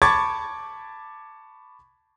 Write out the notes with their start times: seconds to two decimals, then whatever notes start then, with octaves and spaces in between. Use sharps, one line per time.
0.02 A5 B5 C#6 D6 G#6 A6